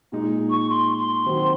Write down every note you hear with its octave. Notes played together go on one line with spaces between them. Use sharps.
A#2 G#3 D#4
C#6
C6
C6
D#3 F#3 C4 F#4 C5